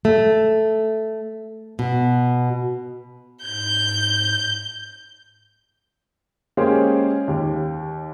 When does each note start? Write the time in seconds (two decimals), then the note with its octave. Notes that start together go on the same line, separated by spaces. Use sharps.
0.05 A3
1.79 B2
3.45 G#2 G6
6.57 G#3 A#3 C#4 G4 G#4 C5
7.28 D#2 G4